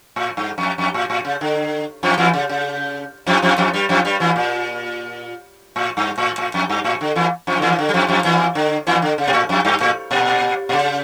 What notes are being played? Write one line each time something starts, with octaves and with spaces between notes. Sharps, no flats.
A2
G2
F2
F2
A2
A2
C#3
D3
F2 F3
E2 E3
C#3
C#3
F2 F3
F2 F3
F2 F3
G2 G3
F2 F3
G2 G3
E2 E3
A#2
A2
G2
A2
A2
F2
G2
A2
D3
E2 E3
F2 F3
D3
E2 E3
E3
D3
G3
F2 F3
F2 F3
E2 E3
D3
E2 E3
D3
C#3
A#2
A2
F2
G2
A2
A#2
A#2
C#3